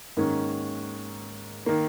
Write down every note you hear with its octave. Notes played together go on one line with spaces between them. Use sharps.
G#2 D#3 A#3 C#4
D#3 A#3